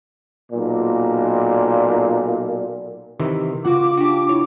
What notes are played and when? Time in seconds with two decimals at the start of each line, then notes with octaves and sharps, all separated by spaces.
0.52 B1 A#2
3.19 C3 D#3 E3
3.65 C#3 F4 F#4 F#5 D6
3.97 D4 F#4 G4
4.29 E4 C#5